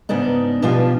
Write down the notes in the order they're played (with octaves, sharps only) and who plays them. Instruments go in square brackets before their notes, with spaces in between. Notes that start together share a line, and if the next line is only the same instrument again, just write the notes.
[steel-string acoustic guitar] G#2 C#3 B3 D4 D#4
B2 F3 D4 F4 G4 G#5